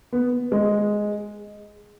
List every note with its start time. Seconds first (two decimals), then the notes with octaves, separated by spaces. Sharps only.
0.13 B3
0.52 G#3